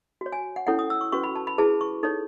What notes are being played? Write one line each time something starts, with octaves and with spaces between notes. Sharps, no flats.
F#4 C#5
G#5
F#5
C#4 E4 A4 C#5 F#5
D#6
E6
C#6
C#4 F#4 B4 C#6
B5
A5
B5
E4 G#4 B4 A5
C#6
D#4 A4 C#5